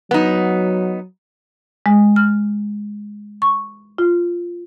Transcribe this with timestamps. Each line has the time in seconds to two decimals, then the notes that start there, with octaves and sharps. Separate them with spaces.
0.11 F#3 B3 D#4
1.86 G#3
2.16 F6
3.42 C#6
3.98 F4